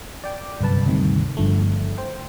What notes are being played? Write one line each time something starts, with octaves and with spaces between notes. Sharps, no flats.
D5 G5 D6
G1 C2 F#2 B4 A5
D2 G2 C3 D#3
G1 D3 F3 A3
C5 G5